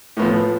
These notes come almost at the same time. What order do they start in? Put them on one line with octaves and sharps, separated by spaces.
A2 B3 F3